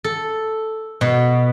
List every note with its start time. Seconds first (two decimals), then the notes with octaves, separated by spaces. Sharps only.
0.04 A4
1.01 B2